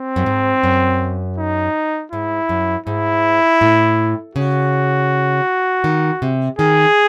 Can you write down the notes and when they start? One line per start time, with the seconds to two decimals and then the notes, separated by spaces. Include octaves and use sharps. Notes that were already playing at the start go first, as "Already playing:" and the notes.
Already playing: C4
0.16 F#2
0.26 G#2
0.63 F#2
1.38 D#4
2.12 G#2 E4
2.49 F#2
2.86 G#2 E4
3.61 A2
4.35 C#3 F#4
5.84 D#3
6.22 C3
6.59 D#3 G#4